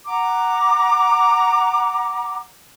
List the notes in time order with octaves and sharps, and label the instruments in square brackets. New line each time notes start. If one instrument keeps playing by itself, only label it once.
[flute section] F#5 A#5 D6